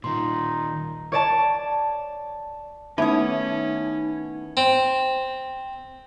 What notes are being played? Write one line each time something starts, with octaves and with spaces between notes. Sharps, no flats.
A#2 D#3 D#4 C6
C#5 D5 A5
D#3 A3 B3 C#4 D#4 E4 D#6 G#6
C4